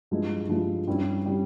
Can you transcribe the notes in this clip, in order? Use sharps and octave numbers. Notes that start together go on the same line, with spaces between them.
G2 F3 G#3 E4
G2 F3 G#3 E4
G2 G3 C#4 E4
G3 C#4 E4